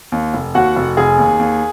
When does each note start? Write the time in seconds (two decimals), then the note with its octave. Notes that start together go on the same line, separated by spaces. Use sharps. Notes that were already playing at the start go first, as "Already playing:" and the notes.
0.12 D#2
0.34 F1
0.54 D#2 F#4 F#5
0.76 F1
0.97 F1 G#4 G#5
1.19 D#2
1.39 D#2